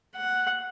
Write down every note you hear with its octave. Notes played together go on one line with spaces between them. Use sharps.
F#5